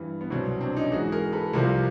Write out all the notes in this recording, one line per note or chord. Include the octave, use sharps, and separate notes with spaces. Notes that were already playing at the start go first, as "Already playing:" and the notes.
Already playing: G2 E3
B3
C2 B2 F#3 C4
C4 D4
C#4 D#4
G#2 E3 F#4 G#4
G#4 A#4
A4 B4
C2 C3 F3 A#4 C5